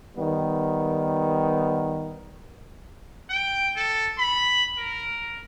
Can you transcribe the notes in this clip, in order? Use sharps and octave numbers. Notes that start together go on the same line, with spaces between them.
D#3 G3 B3
G5
A4
B5
A#4